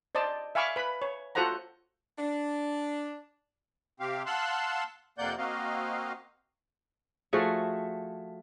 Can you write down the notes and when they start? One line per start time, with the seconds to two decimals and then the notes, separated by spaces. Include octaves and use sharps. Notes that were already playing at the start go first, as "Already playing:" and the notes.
0.15 C5 D5 D#5 A5
0.55 E5 F5 G#5 B5 C#6 D6
0.76 B4 B5
1.02 C#5
1.35 F4 F#4 A4 C5 F#5 A#5
2.19 D4
4.00 C3 C4 G4 F5
4.26 F5 F#5 A5 C6 E6 F#6
5.18 F2 C3 A#3 D5 F#5 G6
5.38 A#3 C4 F#4 D#5 F5
7.33 F3 A3 F#4 G#4